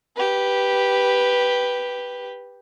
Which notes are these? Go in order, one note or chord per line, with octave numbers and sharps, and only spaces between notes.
G4 B4